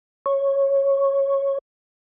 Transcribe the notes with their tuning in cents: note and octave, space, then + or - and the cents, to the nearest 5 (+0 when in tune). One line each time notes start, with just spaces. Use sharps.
C#5 -10